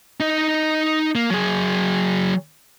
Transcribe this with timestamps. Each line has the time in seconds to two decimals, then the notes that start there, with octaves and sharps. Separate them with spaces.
0.20 D#4 D#5
1.15 A#3
1.30 F#3 G#4